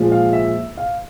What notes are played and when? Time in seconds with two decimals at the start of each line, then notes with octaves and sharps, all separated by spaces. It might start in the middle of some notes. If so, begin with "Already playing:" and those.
Already playing: A#2 F3 G#3
0.12 F5
0.33 E5
0.77 F5